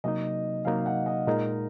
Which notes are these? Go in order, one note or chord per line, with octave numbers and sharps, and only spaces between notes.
C3 F#3 A#3 D#4 D#5
C3 F#3 A#3 D#4 F5
F#5
D#5
A#2 G#3 D#4 A#4